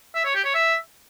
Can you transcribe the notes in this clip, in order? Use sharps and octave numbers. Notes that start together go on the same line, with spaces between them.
E5
C#5
G4
C#5
E5